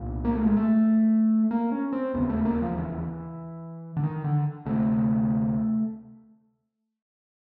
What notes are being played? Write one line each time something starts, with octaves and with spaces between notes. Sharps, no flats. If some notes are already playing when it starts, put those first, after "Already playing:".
Already playing: C2 A#2
A#3
A3
G#3
A3
A#3
C#4
C4
E1 D#2 C#3 B3
A3
A#3
F3
E3
D3
D#3
D3
D2 C3 A3